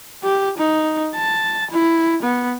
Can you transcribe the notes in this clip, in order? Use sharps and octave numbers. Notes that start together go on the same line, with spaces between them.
G4
D#4
A5
E4
B3